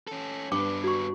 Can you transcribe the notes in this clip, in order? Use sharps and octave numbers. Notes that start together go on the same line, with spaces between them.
C#4 A4
G2 B3 D4 D6
F#4 C#6